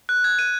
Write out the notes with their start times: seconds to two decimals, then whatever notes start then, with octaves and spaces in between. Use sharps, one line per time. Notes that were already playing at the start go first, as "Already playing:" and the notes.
0.09 F#6
0.24 G#6
0.39 D#7